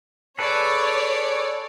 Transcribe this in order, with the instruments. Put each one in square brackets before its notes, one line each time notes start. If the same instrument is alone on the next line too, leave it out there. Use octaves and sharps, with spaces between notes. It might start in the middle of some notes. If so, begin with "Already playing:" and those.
[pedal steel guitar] G#4 A4 B4 [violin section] C#5 D5